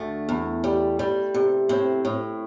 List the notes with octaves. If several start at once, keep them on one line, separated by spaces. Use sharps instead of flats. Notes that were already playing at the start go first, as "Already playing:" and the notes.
Already playing: D2 A3
E2
G3
G3
C3
A2 C4
A2